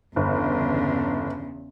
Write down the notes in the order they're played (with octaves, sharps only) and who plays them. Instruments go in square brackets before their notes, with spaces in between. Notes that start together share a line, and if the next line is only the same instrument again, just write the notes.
[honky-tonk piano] G1 [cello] E2 C#3